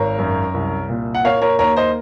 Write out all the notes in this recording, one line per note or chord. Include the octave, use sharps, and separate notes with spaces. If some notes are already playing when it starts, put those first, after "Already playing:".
Already playing: G#1 A#4 C#5
F#2
C2
A#2
F#5
A#3 C#5 F5
A#4 C#5
D#2 A#4 C#5
C5 D#5